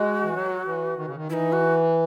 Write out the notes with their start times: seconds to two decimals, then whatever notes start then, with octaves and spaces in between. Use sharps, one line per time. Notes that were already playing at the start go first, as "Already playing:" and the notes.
Already playing: G#3 F#4
0.23 E3
0.34 F#3
0.66 E3
0.97 D#3
1.07 C#3
1.16 D#3
1.29 E3 E4
1.33 D#4
1.52 F#4